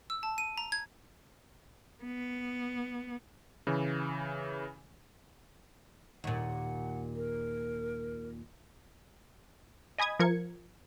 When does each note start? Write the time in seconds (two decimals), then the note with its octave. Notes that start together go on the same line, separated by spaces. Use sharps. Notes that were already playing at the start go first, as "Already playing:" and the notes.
0.10 E6
0.23 A5
0.38 D#7
0.58 A#5
0.72 G#6
2.04 B3
3.67 C#3 E3
6.24 D#2 A#2 F#5
7.16 A#4
9.98 D#5 G#5 B5 D#6 G#6
10.20 F3 A#4 G#6 C#7